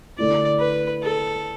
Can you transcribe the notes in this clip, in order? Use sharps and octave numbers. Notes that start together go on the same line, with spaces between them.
D3 A3 E4 D5
B4
A4